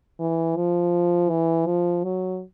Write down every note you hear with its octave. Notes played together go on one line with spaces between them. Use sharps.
E3
F3
E3
F3
F#3